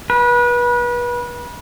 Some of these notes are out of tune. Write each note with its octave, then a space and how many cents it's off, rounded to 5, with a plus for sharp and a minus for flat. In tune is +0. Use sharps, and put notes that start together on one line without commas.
B4 -30